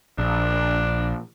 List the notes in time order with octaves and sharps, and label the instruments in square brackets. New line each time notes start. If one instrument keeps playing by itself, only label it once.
[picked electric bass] A#1 [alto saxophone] D4